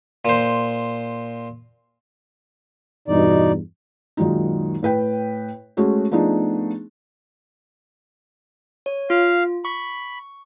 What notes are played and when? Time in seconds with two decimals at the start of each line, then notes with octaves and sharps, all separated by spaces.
0.25 A#2 C5
3.08 E2 G2 B2 D#4 D5
4.17 F#2 A#2 D#3 F#3 G#3 D#4
4.83 A2 B4 G5
5.77 G#3 A3 C#4 F#4 G#4
6.11 F3 A3 B3 D4 D#4 G#4
8.86 C#5
9.10 F4 F5
9.65 B5 C#6